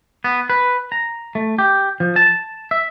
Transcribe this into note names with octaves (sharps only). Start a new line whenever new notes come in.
B3
B4
A#5
A3
G4
F3
A5
E5